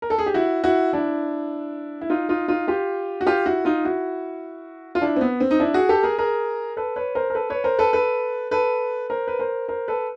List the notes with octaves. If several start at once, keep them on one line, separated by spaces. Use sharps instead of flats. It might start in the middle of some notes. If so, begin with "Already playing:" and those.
A#4
A4
G#4
G4
E4 F#4
E4 F#4
D4 E4
E4
D#4 F4
D#4 F4
D#4 F4
F4 G4
F#4
F4 G4
E4 F#4
D#4 F4
E4 F#4
F4
D4 E4
C4
B3
C4
D#4
D4 E4
F#4 G#4
G4 A4
G#4 A#4
G#4 A#4
A4 B4
B4 C#5
A#4 C5
A#4
A4 B4
B4 C#5
A#4 C5
A4 B4
A4 B4
A4 B4
A#4 C5
B4
A#4 C5
A#4 C5
A4 B4